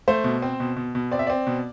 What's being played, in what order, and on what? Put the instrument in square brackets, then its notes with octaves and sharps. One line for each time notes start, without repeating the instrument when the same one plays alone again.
[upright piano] A3 C5
B2
C4
B2
B2
B2
C4 D5
E5
C4 D5
B2